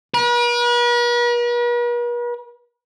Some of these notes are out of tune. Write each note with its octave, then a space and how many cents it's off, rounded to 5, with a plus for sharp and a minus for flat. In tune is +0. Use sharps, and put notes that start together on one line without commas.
B4 -45